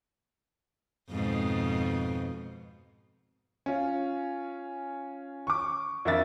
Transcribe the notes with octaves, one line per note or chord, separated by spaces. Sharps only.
F2 G#2 B2
C#4 F4
C#6 D6
F2 D4 A#4 E5 A6